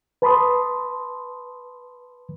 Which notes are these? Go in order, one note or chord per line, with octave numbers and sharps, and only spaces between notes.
B4 A5 B5 C6 D#6